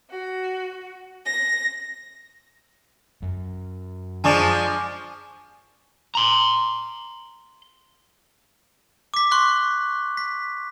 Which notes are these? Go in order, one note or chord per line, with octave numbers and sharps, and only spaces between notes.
F#4
A#6
F#2
F3 G#3 D4 G#5 C#6 D6
A#5 C6
D6 B6
C6 C#6 F#6
B6